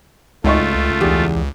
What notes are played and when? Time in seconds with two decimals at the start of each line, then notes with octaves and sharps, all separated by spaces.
0.44 G#1 C#2 A3 F4 D#5 C#6
1.01 E2 G4